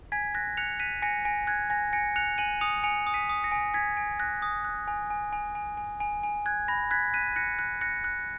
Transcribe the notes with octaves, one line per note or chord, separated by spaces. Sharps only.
G#5 G#6 B6
F#6 A#6
F#6 C#7 F7
F#6 B6 D#7
G#5 A#6 C#7
G#5 A#6
F#6 G#6
G#5 A#6
G#5 A#6 C#7
F#6 C#7 F7
G#5 D#7 F#7
D#6 C#7 F7
G#5 C#7 F7
D#6
B6 D#7
D#6
A#6 C#7
G#5
G#5 G#6 B6
G#5
F#6 A#6
D#6
F#6
G#5
G#5
G#5
G#5
G#5
G#5
G#5
F#6 G#6
B5 A#6
F#6 G#6 B6
F#6 B6 D#7
F#6 A#6 C#7
F#6
F#6 A#6 C#7
F#6